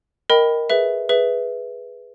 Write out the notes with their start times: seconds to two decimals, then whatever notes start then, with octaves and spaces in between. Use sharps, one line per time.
0.30 A#4 D#5 G5 B5
0.70 G#4 B4 E5
1.09 G#4 B4 E5